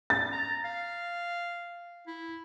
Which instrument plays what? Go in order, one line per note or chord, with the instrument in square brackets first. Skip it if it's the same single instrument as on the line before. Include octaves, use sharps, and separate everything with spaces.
[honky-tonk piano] A6
[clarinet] A#5
F5
E4